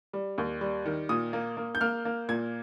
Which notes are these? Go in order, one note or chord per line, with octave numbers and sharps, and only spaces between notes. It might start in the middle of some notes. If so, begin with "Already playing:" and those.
G3
D#2
G3
D#3
A#2 D#6
A#3
A#3
G6
A#3 F6
A#3
A#2 G#6